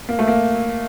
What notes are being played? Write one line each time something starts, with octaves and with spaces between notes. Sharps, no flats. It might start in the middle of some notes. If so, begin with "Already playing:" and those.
A#3
A3
A#3